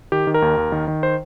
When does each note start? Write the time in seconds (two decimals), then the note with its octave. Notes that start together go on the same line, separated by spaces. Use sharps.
0.12 D#3 G4
0.27 D#3
0.34 A#4
0.42 D#2
0.57 D#2
0.72 D#3
0.88 D#3
1.03 C5